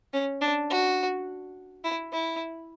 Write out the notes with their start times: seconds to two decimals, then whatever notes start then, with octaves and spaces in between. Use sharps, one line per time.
0.13 C#4
0.41 D4
0.70 F#4
1.84 E4
2.12 E4